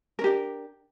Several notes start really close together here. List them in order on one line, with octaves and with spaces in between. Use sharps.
A#4 C#4 G4 D4